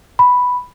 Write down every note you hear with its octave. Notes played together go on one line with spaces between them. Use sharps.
B5